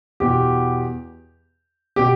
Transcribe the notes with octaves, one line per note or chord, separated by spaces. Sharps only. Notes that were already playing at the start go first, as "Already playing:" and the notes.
E2 B2 G4
B2 G4